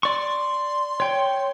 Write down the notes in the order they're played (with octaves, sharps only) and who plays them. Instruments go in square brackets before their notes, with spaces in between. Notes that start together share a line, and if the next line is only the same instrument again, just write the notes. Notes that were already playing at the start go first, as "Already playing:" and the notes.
[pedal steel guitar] D5 C#6 [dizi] C6
[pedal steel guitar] C#5 G5